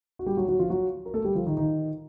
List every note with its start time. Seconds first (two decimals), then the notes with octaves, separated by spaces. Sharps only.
0.19 F#4
0.26 G3 G4
0.37 F#3 F#4
0.48 F#3 F#4
0.59 F3 F4
0.70 F#3 F#4
1.06 A#4
1.14 A3 A4
1.24 G3 G4
1.35 F3 F4
1.46 D#3 D#4
1.57 D#3 D#4